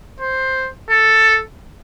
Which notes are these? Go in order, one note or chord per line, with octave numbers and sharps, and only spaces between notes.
C5
A4